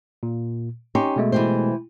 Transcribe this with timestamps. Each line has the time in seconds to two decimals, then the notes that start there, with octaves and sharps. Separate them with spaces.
0.23 A#2
0.95 C#4 D#4 G4 A#5 C6 C#6
1.16 B2 G#3 A3
1.32 E3 G4 C5